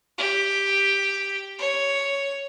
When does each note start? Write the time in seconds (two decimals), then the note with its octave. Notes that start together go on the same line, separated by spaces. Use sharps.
0.18 G4
1.59 C#5